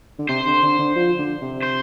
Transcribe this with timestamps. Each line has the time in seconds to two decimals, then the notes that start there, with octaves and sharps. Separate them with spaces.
0.19 D3
0.29 C3 C5
0.46 D3
0.63 D3
0.79 D3
0.96 F3
1.19 D3
1.41 C3
1.63 C5